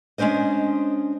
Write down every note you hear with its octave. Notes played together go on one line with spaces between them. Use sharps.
G#3 C#4 D4 C5 D#5